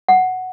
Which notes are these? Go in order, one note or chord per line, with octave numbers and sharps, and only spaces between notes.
F#5